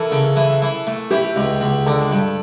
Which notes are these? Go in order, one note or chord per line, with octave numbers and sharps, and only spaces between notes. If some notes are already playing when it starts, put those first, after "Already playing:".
Already playing: E3 A4 A#4
C#3
E3
E3
A3
E3 G4
C#2
C#2
D3 A4
G2